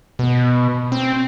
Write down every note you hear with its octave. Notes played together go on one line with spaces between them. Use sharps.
B2
C4